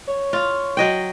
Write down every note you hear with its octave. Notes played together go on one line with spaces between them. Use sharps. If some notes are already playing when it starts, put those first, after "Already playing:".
C#5
F4
F#3 D#5 G5